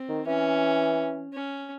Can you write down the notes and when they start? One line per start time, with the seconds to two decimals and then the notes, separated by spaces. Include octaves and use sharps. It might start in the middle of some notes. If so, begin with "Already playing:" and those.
Already playing: C4
0.09 D#3
0.27 E3 C#4
1.33 C#4